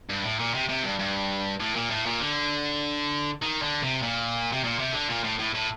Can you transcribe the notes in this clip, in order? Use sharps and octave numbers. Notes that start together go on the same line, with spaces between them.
G2
A2
A#2
C3
C3
G2
G2
A2
A#2
A2
A#2
D3
D#3
D3
C3
A#2
C3
A#2
C3
D3
A#2
A2
A2
A2